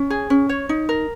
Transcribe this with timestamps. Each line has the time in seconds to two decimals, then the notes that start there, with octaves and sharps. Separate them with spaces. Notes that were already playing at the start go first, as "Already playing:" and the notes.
Already playing: C#4
0.10 G#4
0.30 C#4
0.49 C#5
0.69 D#4
0.89 A#4